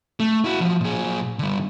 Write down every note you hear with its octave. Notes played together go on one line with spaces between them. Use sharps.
A3
E4 F#4
F3 F#3
A#2 G#4
D3 G3